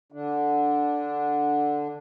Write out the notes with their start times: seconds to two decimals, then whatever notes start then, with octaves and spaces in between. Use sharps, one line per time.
0.12 D3 D4